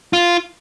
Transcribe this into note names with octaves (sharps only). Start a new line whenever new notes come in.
F4